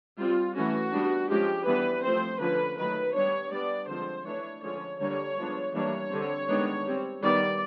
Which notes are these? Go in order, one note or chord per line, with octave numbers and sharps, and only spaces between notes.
G3 C4 F4
E3 A3 C#4 F#4
G3 B3 D4
F3 G#3 C#4 G4
E3 G3 B3 D4 B4
F3 A3 C4 C5
D3 F3 A#3 C#4 B4
D#3 F#3 A3 B4
G3 B3 D4 C#5
G3 B3 D4 D5
D3 F3 G#3 C4 C5
E3 A3 D4 C#5
D3 F3 G#3 C#4 C#5
D3 G3 A#3 D4 C#5
F3 G#3 B3 D4
E3 G3 A#3 D4 C#5
D3 G3 C4
D#3 G#3 B3 D4
G3 C4
D#3 G3 B3 D5